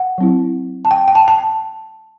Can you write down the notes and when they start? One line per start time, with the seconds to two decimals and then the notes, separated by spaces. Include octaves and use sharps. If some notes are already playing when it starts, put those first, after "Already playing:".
Already playing: F#5
0.18 F#3 C4 E4
0.85 A5
0.91 G5
1.08 G5
1.15 A5
1.28 A5